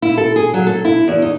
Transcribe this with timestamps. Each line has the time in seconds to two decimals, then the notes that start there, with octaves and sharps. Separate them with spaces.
0.02 E4
0.18 A4
0.36 G#4
0.54 F#3
0.67 A4
0.85 E4
1.08 E2
1.22 D#4